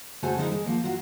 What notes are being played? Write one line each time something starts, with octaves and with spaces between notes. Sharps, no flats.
C#3 A3 F#4 A4 C5 G#5
D3 F3 G#3 D#4 E4 A#4
G#3
F3 A#3
F#3 F4 F#4